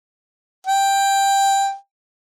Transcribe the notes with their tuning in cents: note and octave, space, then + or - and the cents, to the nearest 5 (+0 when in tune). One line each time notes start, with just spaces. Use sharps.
G5 +10